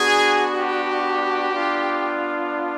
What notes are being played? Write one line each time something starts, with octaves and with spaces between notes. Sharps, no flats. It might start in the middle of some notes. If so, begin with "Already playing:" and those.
Already playing: B3 D4 F#4 G#4
G4
B3 D4 F4